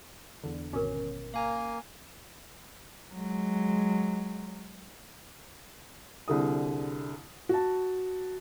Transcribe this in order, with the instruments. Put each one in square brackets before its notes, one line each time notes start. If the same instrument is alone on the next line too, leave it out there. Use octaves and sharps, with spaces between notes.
[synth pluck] E2 D3
[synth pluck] G#1 B2 C#4 [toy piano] A#4 C#5 D6
[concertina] A#3 [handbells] F5 G#5 A#5
[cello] F#3 G#3
[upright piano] C2 D3 G#4 D#6
F#4 A5